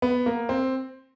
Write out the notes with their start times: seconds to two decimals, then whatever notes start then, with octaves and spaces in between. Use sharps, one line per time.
0.02 B3
0.26 A#3
0.49 C4